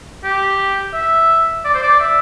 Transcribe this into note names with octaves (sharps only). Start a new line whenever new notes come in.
G4
E5
D5
C5
D5
E5